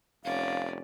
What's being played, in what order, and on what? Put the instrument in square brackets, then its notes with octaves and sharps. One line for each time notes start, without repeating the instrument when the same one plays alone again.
[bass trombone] F1 [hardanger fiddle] C#4 D5 [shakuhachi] F5